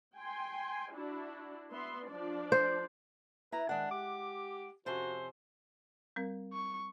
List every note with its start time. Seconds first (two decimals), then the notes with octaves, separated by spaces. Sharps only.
0.16 G5 G#5 C6
0.92 D4 E4 F#4
1.71 B3 E5 C6
2.06 F3 D4 D5
2.52 C5
3.52 E4 B4 A#5
3.69 D#3 G#3 D4 F#5
3.91 G4 D6
4.86 F2 C3 C#4 F#4 C5
6.16 G3 C4 A#4
6.53 C#6